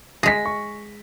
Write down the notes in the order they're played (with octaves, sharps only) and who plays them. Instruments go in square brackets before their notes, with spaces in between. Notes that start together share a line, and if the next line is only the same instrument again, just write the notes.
[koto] G#3 G#4 [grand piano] A#6 B6
[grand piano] C#6